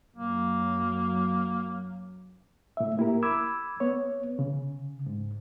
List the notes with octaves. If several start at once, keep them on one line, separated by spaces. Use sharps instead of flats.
F#2 F#3 A#3
A2 E5
A#3 E4 G4 A#4
B5 D6 E6 G#6
B3 C#5
C#3
G#2